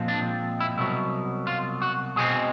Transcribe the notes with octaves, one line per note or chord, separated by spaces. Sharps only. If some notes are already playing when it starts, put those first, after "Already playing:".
Already playing: A#2 F3 G#3 C4
D4
E4
C2 B2 F#3 E4
F4
F#4
B2 G#3 C4 G#4